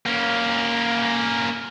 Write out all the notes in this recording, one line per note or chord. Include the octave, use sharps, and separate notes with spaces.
A#3 C#4